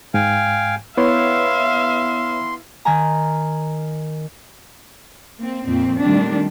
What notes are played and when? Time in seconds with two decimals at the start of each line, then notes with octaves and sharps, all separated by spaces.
0.14 G#2 F5 G5 G#5
0.97 B3 E4 B4 C#5 E5 F5 C6
2.85 D#3 G#5 A#5
5.37 A#3 C4
5.67 F2 A#2 C4
6.01 A#2 D#3 G3 A3 C4 D4